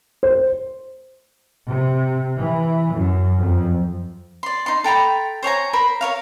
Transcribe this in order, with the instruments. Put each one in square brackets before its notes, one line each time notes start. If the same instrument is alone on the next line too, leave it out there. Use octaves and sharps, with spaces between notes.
[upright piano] C5
[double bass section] C3
E3
F#2
F2
[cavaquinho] D5 C6
D#4 C6
A4 G5 A#5 B5
C5 C#5 G#5 A#5
A#4 C5 B5
A#4 C#5 F5